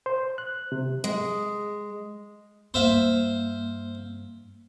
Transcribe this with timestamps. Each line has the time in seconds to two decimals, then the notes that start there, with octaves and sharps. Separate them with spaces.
0.06 C5
0.38 F#6
0.72 C3
1.04 G#3
2.74 G2 A#3 C5 E5 F5